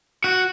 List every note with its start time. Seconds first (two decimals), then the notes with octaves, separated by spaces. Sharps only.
0.24 F#4